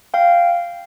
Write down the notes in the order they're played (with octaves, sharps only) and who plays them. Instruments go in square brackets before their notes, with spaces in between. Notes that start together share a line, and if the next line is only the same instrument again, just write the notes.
[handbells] F5 G5